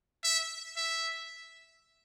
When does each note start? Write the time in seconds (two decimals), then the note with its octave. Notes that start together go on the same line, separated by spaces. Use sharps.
0.24 E5
0.76 E5